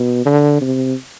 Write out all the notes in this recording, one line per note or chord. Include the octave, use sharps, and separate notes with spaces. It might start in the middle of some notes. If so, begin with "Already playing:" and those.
Already playing: B2
D3
C3